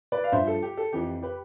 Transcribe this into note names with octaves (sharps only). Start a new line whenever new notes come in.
B4 D5
F5
G2 F3 C5 E5
A4
G4
A4
F2 E3 G4
G4 B4